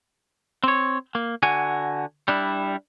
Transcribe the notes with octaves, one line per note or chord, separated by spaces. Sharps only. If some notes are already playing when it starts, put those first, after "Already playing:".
C4 C#5
A#3
D3 F#4 G#5
G3 D4 E4